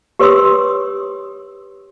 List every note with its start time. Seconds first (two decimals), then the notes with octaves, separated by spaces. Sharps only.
0.19 G4 B4 C#5 C6 D#6 E6